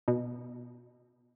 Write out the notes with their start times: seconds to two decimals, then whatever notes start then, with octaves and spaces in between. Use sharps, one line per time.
0.08 B2